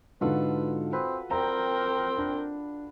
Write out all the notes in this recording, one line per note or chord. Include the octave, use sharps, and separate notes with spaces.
G#2 D3 F4 F#4 A4 B4
C4 B4
C4 A#4 D5 G5 A#5
D4